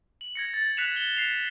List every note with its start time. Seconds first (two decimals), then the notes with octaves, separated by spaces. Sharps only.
0.21 F#7
0.35 G#6 A#6 C#7
0.54 A6
0.77 F#6 B6 C#7 E7 F7
0.96 G7
1.17 C7 F7